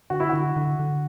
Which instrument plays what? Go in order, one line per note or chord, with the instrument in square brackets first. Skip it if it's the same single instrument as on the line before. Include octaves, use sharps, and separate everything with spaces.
[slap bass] D3 [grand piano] F#4
[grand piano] E4
[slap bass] D3 [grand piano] F#4
[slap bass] D3
D3